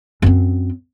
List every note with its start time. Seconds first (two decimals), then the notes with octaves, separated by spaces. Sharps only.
0.22 F#2 C4